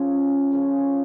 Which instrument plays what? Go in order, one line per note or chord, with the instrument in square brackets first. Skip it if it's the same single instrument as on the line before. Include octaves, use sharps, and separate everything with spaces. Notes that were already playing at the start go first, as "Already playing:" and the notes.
Already playing: [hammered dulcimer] C#3 F3 C#4
C#3 F3 C#4